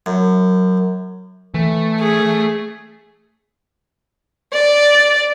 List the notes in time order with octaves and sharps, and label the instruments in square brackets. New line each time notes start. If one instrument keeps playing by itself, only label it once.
[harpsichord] F#2
[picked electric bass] E3 [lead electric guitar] A3
[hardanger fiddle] G#4
[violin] D5